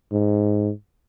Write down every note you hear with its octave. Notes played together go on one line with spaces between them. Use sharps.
G#2